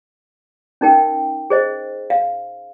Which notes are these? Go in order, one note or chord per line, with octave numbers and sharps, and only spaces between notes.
C#4 D#4 A#4 G5
G#4 C5 D#5
F5